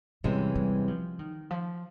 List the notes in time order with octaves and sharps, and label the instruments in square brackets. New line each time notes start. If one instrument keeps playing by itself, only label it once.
[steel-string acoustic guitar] E2 C3 E3 G#3 C#4 [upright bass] G3
[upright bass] G3
F3
D#3
F3